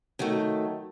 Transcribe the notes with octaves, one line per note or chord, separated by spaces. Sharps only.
D#3 F#3 A3